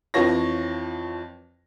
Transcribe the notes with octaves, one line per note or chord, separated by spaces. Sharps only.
F2 E3 F3 C#5 A#6